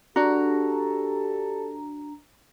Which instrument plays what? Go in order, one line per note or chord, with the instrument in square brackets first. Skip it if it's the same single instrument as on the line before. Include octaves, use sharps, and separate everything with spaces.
[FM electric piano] D4 A#5 [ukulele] F#4 [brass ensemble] G4 A4